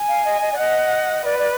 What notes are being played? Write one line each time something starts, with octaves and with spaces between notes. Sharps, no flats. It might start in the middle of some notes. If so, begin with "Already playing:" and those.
Already playing: G#5
F5
D#5
D#5
D5
D#5 F#5
B4 D5
D5